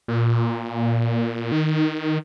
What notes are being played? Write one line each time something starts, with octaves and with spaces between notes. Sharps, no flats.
A#2
D#3